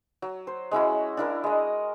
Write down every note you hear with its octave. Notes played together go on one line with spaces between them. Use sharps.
F#3
C5
G#3 C#4 E4 F#4
D4 E4 A#4
G#3 D#5